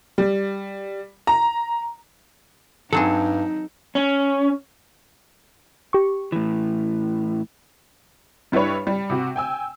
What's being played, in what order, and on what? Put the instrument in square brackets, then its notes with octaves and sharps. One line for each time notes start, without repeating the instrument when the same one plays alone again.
[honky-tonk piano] G3
A#5
[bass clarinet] G2 [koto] F#3 C4 G#4 [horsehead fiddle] D#4 [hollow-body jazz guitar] A4
[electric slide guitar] C#4
[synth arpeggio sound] G4 C#6
[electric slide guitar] A2 E3
[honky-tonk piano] G2 G3 E4 B4 C#5
G3
C3 F#4
G5 G#5 E6